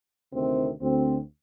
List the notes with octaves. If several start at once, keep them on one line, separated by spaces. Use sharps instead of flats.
D2 C3 D#3 C4
D2 D3 C4